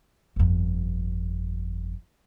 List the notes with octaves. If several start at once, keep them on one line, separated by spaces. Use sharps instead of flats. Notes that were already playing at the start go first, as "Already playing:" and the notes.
G1 F2